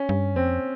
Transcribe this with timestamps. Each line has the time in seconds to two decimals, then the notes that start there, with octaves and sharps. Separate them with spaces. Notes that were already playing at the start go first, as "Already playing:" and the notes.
Already playing: C#4
0.09 G2
0.35 F2 C4